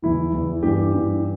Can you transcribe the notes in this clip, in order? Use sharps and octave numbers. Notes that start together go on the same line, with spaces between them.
E2 E3 E4
E2 E3
G2 E3 G4
G2 E3